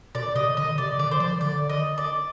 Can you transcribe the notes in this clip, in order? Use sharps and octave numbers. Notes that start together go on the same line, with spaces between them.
B2 D5
C3 D#5
D3 D#5
C3 D5
D3 D5
C5
F3 D5
D3 D5
D#5
D5